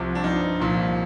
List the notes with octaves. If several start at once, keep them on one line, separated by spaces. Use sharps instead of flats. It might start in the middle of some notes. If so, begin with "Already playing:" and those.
Already playing: C2 C3 F3
D4
G2 F3 D#4
C2 A#2 F3